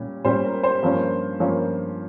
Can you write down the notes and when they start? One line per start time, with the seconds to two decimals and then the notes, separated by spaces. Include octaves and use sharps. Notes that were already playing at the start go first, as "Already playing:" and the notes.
Already playing: A#2 G3 C#4
0.25 A#2 G3 C#4 C5
0.44 A#4
0.63 C5
0.83 G2 F3 A#3 C#4
1.40 G2 F3 A#3 C#4